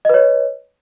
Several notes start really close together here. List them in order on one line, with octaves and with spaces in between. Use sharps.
D#5 B4 C#5